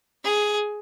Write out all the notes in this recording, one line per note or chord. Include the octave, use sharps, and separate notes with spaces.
G#4